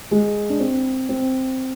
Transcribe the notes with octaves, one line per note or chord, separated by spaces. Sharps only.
G#3
D4
C4
C4